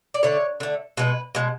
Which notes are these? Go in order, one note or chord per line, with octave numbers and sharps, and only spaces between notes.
D5
D3 A3 C#5
D3 A3
B2 G#3 B4
B2 G#3